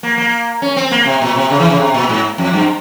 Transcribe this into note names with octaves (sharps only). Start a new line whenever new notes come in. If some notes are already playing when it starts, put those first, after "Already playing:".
A#3
A#3
C#4
C4
A#3
C3
A#2
C3
C#3
E3
C#3
C3
A#2
G#2
F2
G2